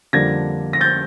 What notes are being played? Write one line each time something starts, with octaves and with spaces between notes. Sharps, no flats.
F2 D3 G3 A#3 D4 G#6 A#6
A#6
G6 A6